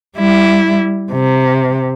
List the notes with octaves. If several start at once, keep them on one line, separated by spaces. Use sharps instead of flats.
G3 E4
C3